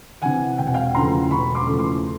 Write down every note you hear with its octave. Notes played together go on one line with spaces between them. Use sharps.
C3 E3 F#5 G#5
E1 G5
F#5
F5 G5
E2 C#3 F3 A3 A#5 C6
E1 B5 C#6
C6 D6
E2 C#3 F3 A3
C6 D6